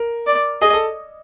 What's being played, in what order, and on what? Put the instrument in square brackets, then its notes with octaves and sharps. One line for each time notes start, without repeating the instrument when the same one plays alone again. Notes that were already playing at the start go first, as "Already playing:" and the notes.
Already playing: [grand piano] A#4
[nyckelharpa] D5
[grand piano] G#4 [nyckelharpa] D#5
[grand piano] A4